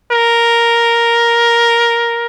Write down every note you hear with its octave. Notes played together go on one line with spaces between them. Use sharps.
A#4